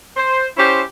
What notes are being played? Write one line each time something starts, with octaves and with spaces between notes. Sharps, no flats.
C5
C#4 E4 G4 C5